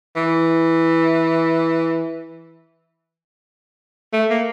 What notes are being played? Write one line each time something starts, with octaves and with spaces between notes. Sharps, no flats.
E3
A3
A#3